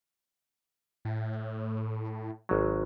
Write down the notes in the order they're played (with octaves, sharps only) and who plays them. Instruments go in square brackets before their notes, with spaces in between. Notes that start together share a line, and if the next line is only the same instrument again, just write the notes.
[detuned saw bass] A2
[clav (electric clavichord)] G#1 F#3